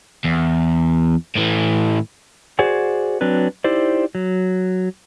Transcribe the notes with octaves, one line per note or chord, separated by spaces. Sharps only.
E2
A2 E3
F#4 G#4 C5 D5 F#5 G#5
F#3 C4 D4 B4
D#4 E4 G4 C5 D5
F#3